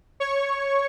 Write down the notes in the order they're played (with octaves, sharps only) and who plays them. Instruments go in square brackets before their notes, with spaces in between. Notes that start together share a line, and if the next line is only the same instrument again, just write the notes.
[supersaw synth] C#5 C#6